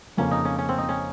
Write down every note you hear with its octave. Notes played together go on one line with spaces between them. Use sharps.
F2 C#3 F3 A#3 C#4
D#4
C#4
C#4
C4
D#4
C#4